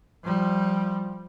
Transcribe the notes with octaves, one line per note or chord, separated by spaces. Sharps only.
F3 G3